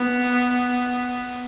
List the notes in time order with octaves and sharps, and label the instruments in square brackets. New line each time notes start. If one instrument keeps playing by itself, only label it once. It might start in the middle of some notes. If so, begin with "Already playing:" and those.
Already playing: [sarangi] B3